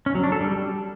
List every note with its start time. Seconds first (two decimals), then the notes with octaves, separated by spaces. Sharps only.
0.06 C#4
0.15 F#3
0.23 D4
0.32 A4
0.41 G3